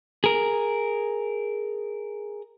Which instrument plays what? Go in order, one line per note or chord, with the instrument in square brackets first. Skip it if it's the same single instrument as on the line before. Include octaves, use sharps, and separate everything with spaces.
[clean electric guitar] G#4 A#4